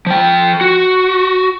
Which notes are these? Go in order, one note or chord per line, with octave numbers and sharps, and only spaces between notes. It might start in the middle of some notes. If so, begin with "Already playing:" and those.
F3 G5
F#4